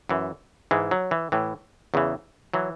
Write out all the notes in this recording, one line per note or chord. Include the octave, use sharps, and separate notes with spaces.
F#2 E3
G#2 E3 G#3
F#3
E3
A2 E3
E2 C#3 E3
E3 F#3